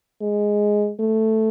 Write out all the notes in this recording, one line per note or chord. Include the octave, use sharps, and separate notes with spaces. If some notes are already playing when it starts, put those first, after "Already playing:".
G#3
A3